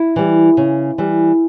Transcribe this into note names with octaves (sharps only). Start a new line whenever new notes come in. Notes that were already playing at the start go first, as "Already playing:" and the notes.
Already playing: E4
E3 G3
C#3
E3 G3